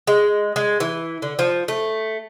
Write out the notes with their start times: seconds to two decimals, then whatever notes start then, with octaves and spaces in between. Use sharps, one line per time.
0.07 G#3
0.56 G#3
0.80 E3
1.22 D3
1.39 F3
1.68 A3